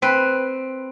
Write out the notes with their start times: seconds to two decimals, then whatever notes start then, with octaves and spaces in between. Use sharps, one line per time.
0.02 C4 B4